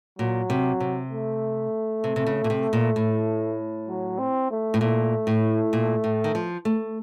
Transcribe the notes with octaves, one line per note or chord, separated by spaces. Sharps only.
A#2 F#3
C3
C3
A3
C3
C3
C#3
A#2
C3
A#2
A2
F#3
C4
A3
A2
A#2 A3
A2
A#2
A2
D#3
F3
A3